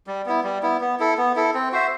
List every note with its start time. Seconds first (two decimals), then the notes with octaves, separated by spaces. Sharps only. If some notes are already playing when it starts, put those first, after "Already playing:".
0.07 G3
0.26 B3 E4
0.44 G3
0.63 B3 E4
0.81 B3
1.00 E4 A4
1.18 B3
1.36 E4 A4
1.54 C4
1.72 F#4 C5 E5